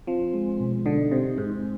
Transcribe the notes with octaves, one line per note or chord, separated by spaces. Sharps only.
F3 C4
G#3
B2
D3 D#4
C3 C4
G#2 G#3